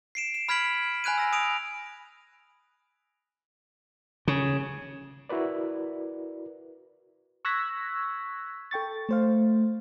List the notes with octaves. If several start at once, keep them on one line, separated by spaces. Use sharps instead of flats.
C7 D7 E7
E7
B5 F6 G#6 B6 D7 F#7
G#5 B5 F#6 G#6 D#7
E6 A#6 D#7
D#6 D7 D#7 F7
C#3
E4 F#4 A#4 B4 D5
C#6 E6 F#6 G#6 A#6 B6
A4 G5 C#6 A6
A3 C5 F5